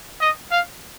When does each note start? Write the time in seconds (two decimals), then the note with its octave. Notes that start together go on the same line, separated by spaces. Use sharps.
0.21 D#5
0.51 F5